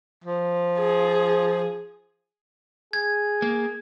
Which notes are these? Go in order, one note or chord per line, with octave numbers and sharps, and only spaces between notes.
F3
G#4
G#4 G#6
A#3